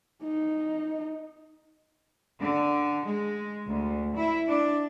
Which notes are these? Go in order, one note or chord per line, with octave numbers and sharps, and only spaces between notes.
D#4
D3
G#3
D2
E4
D4